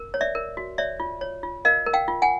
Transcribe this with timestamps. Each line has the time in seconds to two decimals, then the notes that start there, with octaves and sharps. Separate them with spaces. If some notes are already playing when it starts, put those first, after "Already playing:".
Already playing: A#4
0.14 C#5
0.21 D5 E5
0.35 A#4
0.57 F#4
0.78 C#5 D5 E5
1.00 F4
1.21 C#5
1.43 F4
1.65 A#4 D#5 F5
1.86 A#4
1.94 F5 G5
2.08 F4
2.22 F#5 G#5